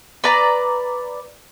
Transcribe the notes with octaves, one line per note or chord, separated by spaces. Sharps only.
B4 D5 A#5